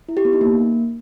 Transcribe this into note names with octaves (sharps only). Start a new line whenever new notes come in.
E4
G4
B3
D#4
A#3